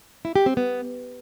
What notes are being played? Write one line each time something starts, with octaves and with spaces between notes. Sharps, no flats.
E4
G4
C4
B3